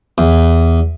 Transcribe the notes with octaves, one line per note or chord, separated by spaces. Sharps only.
E2